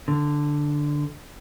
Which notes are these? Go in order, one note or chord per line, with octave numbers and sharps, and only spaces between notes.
D3